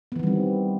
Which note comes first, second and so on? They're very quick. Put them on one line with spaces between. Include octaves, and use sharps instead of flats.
B3 E3 D#3 G3 C4